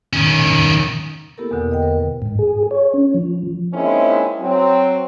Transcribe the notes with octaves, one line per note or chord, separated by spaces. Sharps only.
D#3 C#4
A#3 B3 E4 G4 A4 A#4
E2 B2 D3 F#5
A#4 D#5 G5
A#4 C5 D#5
G#2
G#4
C#5
C#4
F3
G#3 A#3 C4 C#4 D#4 E4
F#3 C4